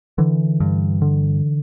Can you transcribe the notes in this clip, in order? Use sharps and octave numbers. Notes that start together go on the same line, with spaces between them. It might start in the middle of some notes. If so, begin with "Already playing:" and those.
D3 E3
G2
D3